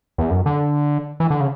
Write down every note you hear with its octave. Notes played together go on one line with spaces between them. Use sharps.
E2
F#2
D3
E3
D3
C#3